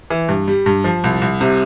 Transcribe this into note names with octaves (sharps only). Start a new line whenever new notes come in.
E3
G2
G3
G2
F3
C2
C2
C3